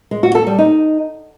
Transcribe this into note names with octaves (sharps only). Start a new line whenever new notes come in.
G#3
F#4
A4
G3
D#4